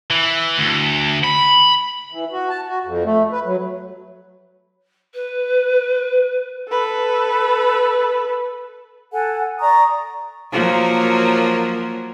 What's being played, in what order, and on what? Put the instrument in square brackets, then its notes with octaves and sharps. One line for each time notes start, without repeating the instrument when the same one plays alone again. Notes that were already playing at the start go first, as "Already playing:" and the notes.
[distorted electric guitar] E3
D2
B5
[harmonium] E3
F#4
A5
F#4
F2
A3
B4
F#3
[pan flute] B4
[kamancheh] A4 B4
[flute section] A4 F#5 G#5
D5 A#5 C#6 D#6
[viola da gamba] F3 F#3 A#3